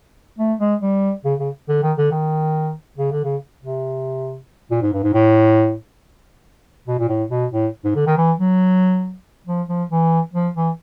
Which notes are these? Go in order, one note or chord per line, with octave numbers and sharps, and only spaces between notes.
A3
G#3
G3
C#3
C#3
D3
D#3
D3
D#3
C#3
D3
C#3
C3
A#2
G#2
G2
G#2
A2
B2
A#2
A2
B2
A2
G#2
D3
D#3
E3
F#3
F3
F3
E3
F3
E3